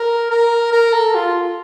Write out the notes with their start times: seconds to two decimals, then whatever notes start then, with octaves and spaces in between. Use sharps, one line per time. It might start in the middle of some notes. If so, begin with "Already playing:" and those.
Already playing: A#4
0.30 A#4
0.72 A#4
0.93 A4
1.15 F4